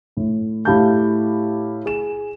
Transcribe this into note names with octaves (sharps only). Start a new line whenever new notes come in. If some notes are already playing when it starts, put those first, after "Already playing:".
A2
A2 E4 G4 F5 A5 G6
G#4 E7